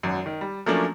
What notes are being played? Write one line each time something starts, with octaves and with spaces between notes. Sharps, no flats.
G#1 F#2
D#3
G3
F3 F#3 A3 A#3 C#4 D4